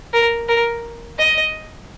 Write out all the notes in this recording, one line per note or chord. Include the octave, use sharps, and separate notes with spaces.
A#4
A#4
D#5